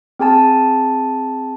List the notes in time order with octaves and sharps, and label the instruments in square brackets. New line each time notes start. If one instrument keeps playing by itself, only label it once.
[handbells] C4 G#4 G#5 A5